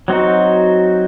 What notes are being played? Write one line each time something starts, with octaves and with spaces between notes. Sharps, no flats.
F#3 C4 D#4 F#4